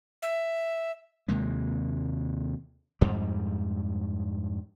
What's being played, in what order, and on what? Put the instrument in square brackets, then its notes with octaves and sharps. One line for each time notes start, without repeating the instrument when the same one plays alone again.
[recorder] E5
[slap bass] D#2 C3 G#3 A#3
F2 G#2 G3